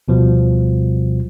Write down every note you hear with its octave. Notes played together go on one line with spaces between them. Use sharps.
D2 B2 F3 G3